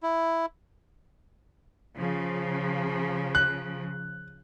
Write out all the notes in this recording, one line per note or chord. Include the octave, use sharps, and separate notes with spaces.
E4
C#3 F3
F#6